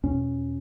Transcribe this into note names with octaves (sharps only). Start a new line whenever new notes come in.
E2 B2 C#4